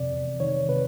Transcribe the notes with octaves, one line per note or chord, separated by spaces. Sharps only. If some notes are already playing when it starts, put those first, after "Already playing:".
Already playing: F2 C3 D5
E2
D#3 C#5
C3 B4